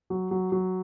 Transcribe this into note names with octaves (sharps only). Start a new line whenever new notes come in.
F#3
F#3
F#3